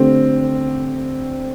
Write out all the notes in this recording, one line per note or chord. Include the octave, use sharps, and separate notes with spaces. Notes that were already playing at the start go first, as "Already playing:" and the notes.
Already playing: D3 A3 C4 G4